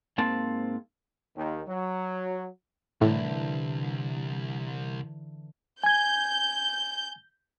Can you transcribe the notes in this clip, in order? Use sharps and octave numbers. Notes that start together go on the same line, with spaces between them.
G#2 A#3 C4 A5
D#2 D#3
F#3
C2 A2 D3 E3 D4
G#5 G6 G#6